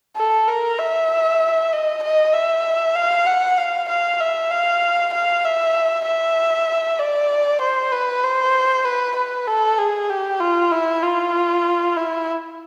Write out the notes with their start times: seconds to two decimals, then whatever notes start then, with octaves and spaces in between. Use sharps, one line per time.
0.16 A4
0.48 A#4
0.78 E5
1.72 D#5
2.03 D#5
2.33 E5
2.96 F5
3.26 F#5
3.58 F5
3.89 F5
4.20 E5
4.50 F5
5.13 F5
5.44 E5
6.06 E5
6.99 D5
7.61 C5
7.92 B4
8.23 C5
8.85 B4
9.16 B4
9.47 A4
9.78 G#4
10.09 G4
10.40 F4
10.71 E4
11.03 F4
11.96 E4